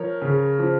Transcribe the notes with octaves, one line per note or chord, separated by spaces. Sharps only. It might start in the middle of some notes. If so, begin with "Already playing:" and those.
Already playing: F3 A#4 C#5
C#3
F3